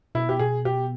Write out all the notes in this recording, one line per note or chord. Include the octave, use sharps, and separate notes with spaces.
B2 E4
G4
B2 G#4
B2 G4